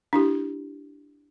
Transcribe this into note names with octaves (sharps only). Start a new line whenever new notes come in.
D4 E4 G4